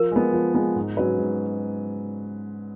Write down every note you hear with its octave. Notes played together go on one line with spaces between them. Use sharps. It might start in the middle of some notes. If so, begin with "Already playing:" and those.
Already playing: F3 A#4
G#3 B3
F3
G#3 B3
G#2
F#3 C#4 F#4 B4
G#2